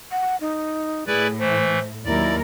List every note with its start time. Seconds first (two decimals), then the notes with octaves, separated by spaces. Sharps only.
0.11 F#5
0.41 D#4
1.07 A2 E4 G#4 B4 D5
1.39 E3 A3 C5
2.05 D#2 F#3 E4 A#4 D5